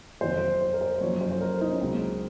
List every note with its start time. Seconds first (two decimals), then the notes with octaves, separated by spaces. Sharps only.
0.21 F2 D#3 F#3 C5
0.61 C5
0.74 A#4
0.81 C5
1.01 F#2 F3 A#3 C#5
1.21 C5
1.32 C5
1.41 A#4
1.61 D#4
1.71 C#4
1.81 C#2 C#3 F#3 A#3 C4